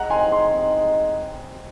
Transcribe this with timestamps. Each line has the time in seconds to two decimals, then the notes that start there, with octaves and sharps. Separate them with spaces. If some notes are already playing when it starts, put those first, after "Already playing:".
Already playing: G#3 F#5 A#5
0.10 C4 D#4 G#5 C6
0.31 G#3 G#5 C6
0.52 C4 D#4
0.74 G#3